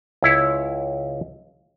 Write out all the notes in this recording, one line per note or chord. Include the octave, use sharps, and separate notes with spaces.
C#2 E4 C#5